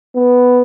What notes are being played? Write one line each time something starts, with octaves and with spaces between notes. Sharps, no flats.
B3